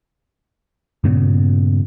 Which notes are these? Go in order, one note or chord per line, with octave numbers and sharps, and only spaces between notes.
G2 A#2 C#3 B3